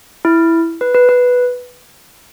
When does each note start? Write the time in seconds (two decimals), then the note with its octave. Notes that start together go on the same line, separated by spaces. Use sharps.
0.25 E4
0.81 B4
0.95 B4
1.09 B4